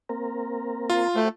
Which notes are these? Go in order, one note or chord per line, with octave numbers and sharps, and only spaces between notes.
A#3 C4 A#4
F4
A3 F#4 C5 G5